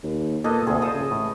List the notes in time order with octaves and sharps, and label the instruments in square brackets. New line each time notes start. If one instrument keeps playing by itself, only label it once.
[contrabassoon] D#2
[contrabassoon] A#2 [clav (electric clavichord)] A#3 B3 [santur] A4 D#5
[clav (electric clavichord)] D2 C3 [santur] G#4
[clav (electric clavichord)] F4 A4 C5 [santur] A5 D#6
[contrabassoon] C#3
[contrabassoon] A1 [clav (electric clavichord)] A2